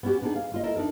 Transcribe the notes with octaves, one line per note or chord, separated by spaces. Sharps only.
B3 C#4 D4 F#4 G4
B3 D4 D#4 G4 G#4
F5
A#3 F4 D#5
E4 A4 A#4 D#5 E5
D4 D#4 A4 A#4